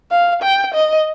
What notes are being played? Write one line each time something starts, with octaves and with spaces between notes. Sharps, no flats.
F5
G5
D#5